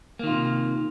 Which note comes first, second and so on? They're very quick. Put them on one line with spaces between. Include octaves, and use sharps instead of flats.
A#3 D#3 F4 C3